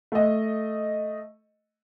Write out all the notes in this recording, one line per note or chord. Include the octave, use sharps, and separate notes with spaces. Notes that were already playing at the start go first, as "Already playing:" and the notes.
A3 D#5